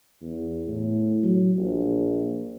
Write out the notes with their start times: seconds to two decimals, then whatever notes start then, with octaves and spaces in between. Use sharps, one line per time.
0.22 E2
0.68 A2
1.23 F#3
1.58 A#1